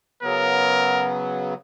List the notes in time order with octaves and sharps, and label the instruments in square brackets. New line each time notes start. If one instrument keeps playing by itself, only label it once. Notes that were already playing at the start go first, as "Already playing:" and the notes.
[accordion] C#3 F#3 B3 [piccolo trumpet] A#4